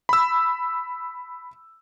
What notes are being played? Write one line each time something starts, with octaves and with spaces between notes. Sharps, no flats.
B5 E6